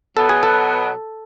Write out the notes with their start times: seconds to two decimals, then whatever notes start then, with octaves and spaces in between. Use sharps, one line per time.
0.16 B2 F#3 B3 A4
0.29 G#4
0.43 A4